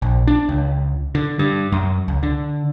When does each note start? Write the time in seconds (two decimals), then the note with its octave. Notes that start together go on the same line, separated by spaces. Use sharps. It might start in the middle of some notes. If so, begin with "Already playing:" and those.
0.02 A#1
0.27 D4
0.49 C#2
1.15 D3
1.39 G2
1.72 F#2
2.08 C#2
2.23 D3